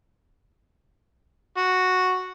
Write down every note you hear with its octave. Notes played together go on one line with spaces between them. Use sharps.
F#4